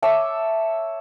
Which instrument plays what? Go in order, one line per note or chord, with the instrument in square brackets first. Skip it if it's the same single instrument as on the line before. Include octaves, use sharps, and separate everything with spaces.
[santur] C#5 E5 A5 D6